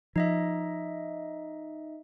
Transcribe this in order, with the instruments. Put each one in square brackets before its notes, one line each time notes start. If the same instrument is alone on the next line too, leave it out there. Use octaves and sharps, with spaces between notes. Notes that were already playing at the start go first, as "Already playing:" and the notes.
[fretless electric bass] F3 [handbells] D#4 D#5 E5